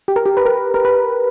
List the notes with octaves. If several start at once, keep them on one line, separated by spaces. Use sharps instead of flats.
G4
A#4
G4
B4
A#4
A#4
B4